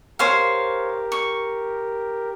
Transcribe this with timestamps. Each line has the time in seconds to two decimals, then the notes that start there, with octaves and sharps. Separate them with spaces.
0.19 G4 A#4 C5 C#5 F5
1.12 C#6